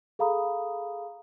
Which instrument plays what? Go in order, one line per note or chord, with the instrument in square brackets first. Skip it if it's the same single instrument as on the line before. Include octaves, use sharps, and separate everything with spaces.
[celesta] G#4 A4 F5 A#5 B5 D#6